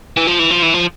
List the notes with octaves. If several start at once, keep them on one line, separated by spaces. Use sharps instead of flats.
E3
F3
E3
F3
E3
F3